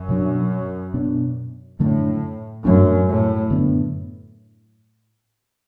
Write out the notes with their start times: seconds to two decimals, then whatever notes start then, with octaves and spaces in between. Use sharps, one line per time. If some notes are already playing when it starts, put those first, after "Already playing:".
Already playing: F#2
0.09 B2 F#3 D4
0.94 B2 B3 D4
1.79 F#2 A2 D3 A3 D4
2.64 F#2 A2 F#3 A3 D4
3.08 A2
3.50 F#2 D3 B3 D4